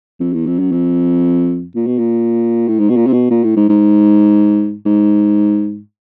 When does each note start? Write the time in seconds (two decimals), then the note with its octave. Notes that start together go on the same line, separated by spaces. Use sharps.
0.20 F2
0.33 E2
0.46 F2
0.59 F#2
0.71 F2
1.75 A#2
1.86 B2
1.98 A#2
2.68 A2
2.79 G#2
2.90 B2
2.96 A#2
3.06 C3
3.12 B2
3.30 A#2
3.44 A2
3.56 G#2
3.69 G#2
4.85 G#2